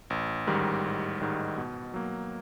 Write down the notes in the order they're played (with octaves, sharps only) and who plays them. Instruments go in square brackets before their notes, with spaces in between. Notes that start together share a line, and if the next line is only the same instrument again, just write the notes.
[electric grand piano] A1
G#2 D#3 G3
A1
G#2 D#3 G3
B2
F#3 A#3